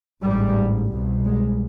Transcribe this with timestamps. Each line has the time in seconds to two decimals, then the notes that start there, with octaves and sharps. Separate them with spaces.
0.24 A1 G#2 G3
0.91 C2 B2
1.25 G#3